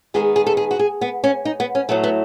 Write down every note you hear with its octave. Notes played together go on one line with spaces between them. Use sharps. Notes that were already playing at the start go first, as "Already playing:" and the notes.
D#3 G#3 B3 G#4
G#4
A4
G#4
F#4
G#4
B3
C#4
D#4
B3
C#4
A2 F#3 A3 B3
B3